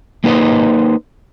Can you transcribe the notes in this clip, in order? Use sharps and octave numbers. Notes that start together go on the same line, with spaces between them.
A#3 D#4 B4 C5 D#5